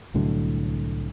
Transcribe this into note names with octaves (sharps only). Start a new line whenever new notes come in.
C2 A2 D3 F#3